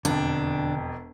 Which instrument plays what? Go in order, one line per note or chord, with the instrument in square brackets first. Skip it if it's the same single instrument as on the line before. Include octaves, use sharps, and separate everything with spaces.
[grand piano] E1 F2 [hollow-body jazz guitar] D3 [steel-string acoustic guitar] D4